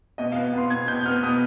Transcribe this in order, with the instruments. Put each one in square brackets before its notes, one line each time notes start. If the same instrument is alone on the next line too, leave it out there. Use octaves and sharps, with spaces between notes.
[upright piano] B2 D#5
F5
B3
B3 C6
B2 G#6
B2 G6
G6
B3 F6
B2 D#6